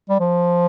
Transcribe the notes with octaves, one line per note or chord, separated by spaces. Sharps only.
G3
F3